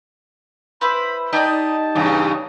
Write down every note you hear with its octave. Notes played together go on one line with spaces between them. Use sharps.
E4 B4 C5 B5
D#4 G4 D5 D#5 A5
E2 G2 C#3